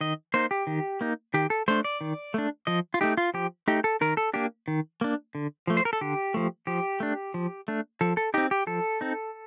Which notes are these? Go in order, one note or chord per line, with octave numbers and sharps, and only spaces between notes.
D#3 D#5
A#3 D#4 C5
G4
D#3
A#3 D#4
D#3 G4
A4
A3 D4 C5
D5
D#3
A3 D4
F3 D#5
F4
A3 D#4 G4
F4
F3 G4
A3 D#4 G4
A4
D#3 A#4
A4
A#3 D4 G4
D#3
A#3 D4
D3
F3 A3
C5
A#4
A4
D3 G4
F3 A3
F3 G4
A3 D4
F3
A3 D4
F3 A4
A4
C4 D#4 G4
G4
F3 A4
C4 D#4